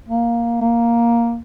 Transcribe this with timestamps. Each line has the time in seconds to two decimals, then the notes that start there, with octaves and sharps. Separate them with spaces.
0.09 A#3
0.62 A#3